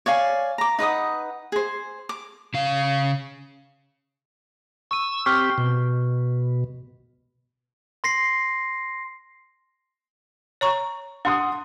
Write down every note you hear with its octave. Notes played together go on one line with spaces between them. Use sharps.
C#5 D5 F5 G#5
A#5 D6
D#4 B4 F#5 D#6
G#4 C5
D6
C#3 F5
C#6 E6 D#7
C4 G4 C#6 F6 G6
B2
C6 A#6 C7
C#5 A#5 C#6
D4 F#5 C6 D#6